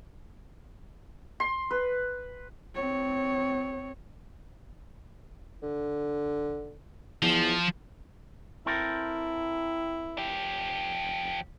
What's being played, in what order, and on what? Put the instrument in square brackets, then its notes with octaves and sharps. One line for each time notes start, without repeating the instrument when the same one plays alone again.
[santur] C6
B4
[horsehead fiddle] C4 C#5
[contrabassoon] D3
[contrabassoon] E2 [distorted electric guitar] F3
[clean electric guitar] C4 A4 A#4 [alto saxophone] E4
[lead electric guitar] F3 G4